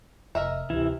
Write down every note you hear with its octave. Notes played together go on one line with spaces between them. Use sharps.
F1 A#4 D#5 E5
D2 A2 C3 E3 E4